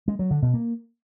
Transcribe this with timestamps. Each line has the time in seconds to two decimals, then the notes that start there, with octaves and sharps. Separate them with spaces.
0.08 G#3
0.19 F#3
0.31 D3
0.42 B2
0.54 A#3